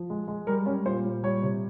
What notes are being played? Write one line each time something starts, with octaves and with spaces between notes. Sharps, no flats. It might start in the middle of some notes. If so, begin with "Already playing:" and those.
Already playing: F3
G#3
G#3
G3 A#4
G3 C#4
A#2 C5
A#2
G3 C#5
C3